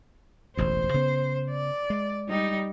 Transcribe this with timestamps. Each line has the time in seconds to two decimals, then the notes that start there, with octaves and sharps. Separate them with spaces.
0.57 E1 A1 D2 C5
0.94 C#3 B3
1.51 D5
1.90 G#3
2.28 G3 D#4